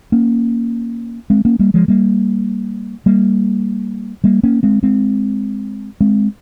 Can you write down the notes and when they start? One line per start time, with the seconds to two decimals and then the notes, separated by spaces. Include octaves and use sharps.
0.12 A#3 C#4
1.30 G#3 C4
1.45 A#3 C#4
1.59 G3 A#3
1.74 F3 G#3
1.88 G3 A#3
3.06 G3 A#3
4.24 G3 A#3
4.43 A#3 C#4
4.63 G#3 C4
4.83 G#3 C4
6.01 G#3 C4